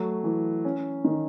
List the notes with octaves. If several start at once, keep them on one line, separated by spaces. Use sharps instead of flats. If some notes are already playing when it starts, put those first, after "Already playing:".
Already playing: F#3 A3
E3
C#4
D#3